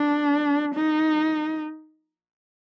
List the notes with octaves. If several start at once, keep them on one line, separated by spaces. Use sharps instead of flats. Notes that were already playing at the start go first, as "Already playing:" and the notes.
Already playing: D4
D#4